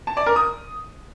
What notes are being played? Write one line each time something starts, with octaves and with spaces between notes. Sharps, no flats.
A5
D5
A#4
D#6